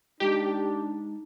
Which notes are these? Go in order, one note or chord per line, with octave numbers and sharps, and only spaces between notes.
G#3 D4 D#4 G4